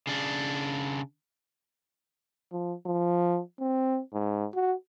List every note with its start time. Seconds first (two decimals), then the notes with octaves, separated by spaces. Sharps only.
0.07 C#3 D4
2.52 F3
2.86 F3
3.60 C4
4.13 G#2
4.54 F#4